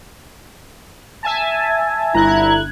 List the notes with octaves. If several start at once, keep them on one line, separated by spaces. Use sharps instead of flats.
E5 G#5 A5
G1 E4 A#5 F#6 G#6